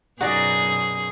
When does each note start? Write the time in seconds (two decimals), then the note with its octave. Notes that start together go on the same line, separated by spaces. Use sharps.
0.21 F#2 B2 D#4 F#4 G#4 D5